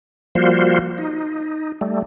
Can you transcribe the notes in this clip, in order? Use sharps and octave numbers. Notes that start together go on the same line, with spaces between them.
F3 G3 A#3 F4 F#4 C5
D#4
G3 A3